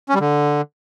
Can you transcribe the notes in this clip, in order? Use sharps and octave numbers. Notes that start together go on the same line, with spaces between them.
C#4
G3
D3